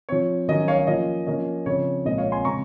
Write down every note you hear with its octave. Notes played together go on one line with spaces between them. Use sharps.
F3 C4 C#5
D#3 F#3 C#4 D#5
C#5 F5
F3 A#3 C#4 D#5
F3 A#3 C#4 D#5
C#3 F3 C4 C#5
A#2 F3 G#3 C4 D#5
C#5 F5
G#5 C6
C#3 G#3 C4 A#5 C#6